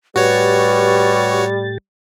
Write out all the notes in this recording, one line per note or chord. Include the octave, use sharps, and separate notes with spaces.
A2 G3 F#4 G4 B4 C#5 A6